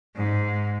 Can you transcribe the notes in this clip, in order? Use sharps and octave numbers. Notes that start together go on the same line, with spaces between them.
G#2